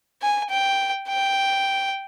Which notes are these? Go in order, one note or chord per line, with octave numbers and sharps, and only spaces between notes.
G#5
G5
G5